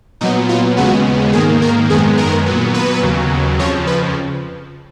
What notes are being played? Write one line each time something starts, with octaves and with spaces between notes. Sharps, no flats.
A#2 F#3 B3 D#4
F4
D#2 C#3 G#3 B3 F#4
G#2 D#3 A#3 G#4
A#4
F#2 D#3 G#3 B3 G#4
A#4
A#2 F#3 B3
B4
D#2 C#3 F#3
F2 C#3 F3 C#5
B4